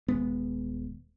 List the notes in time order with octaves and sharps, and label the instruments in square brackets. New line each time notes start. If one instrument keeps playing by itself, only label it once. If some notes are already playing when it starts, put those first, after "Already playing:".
[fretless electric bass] D#1 G#3 B3